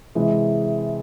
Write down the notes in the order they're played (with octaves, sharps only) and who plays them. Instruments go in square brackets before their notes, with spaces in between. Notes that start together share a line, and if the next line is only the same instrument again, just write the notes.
[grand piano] C3 E3 G#3